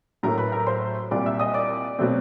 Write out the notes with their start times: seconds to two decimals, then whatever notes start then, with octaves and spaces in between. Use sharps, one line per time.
0.23 A2 F#3 A3 C#4 A#4 A#5
0.38 B4 B5
0.52 A#4 A#5
0.67 C5 C6
1.11 C2 A#2 G3 D5 D6
1.26 E5 E6
1.39 D#5 D#6
1.54 D5 D6
1.99 B2 F#3 A3 C4